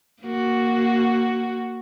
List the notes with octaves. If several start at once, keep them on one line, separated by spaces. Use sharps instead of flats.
A#3 F#4